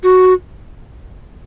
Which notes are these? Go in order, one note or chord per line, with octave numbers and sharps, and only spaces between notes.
F#4